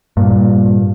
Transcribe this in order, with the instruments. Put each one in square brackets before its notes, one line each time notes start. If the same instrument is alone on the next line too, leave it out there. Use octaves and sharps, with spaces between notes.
[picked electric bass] G2 A#2